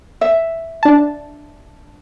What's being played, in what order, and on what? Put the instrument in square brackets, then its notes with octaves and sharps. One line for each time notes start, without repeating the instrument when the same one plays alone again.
[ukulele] E5
[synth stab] D4 A5